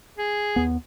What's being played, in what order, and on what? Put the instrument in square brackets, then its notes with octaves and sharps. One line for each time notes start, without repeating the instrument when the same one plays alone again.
[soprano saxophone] G#4
[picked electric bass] D#2 B3